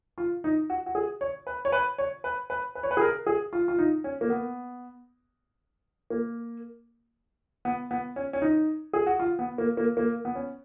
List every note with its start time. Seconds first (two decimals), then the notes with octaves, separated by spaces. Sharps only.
0.18 F4
0.44 D#4
0.70 F#4
0.86 F#4
0.95 G#4
1.21 C#5
1.47 B4
1.65 C#5
1.72 B4
1.98 C#5
2.24 B4
2.50 B4
2.75 B4
2.83 C#5
2.91 B4
2.97 G#4
3.01 A#4
3.27 G#4
3.53 F4
3.68 F4
3.79 D#4
4.04 C#4
4.21 A#3
4.30 B3
6.10 A#3
7.65 B3
7.91 B3
8.16 C#4
8.33 C#4
8.42 D#4
8.94 G#4
9.07 F#4
9.19 F4
9.39 B3
9.58 A#3
9.77 A#3
9.97 A#3
10.25 B3
10.35 C#4